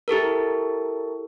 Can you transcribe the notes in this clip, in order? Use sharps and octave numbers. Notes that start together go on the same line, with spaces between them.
E4 G4 A4 A#4